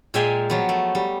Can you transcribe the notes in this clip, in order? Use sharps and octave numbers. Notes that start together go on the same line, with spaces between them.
A#2 G#3 A#3 E5 G5 G#5
F3 F#3 B3
A3
G3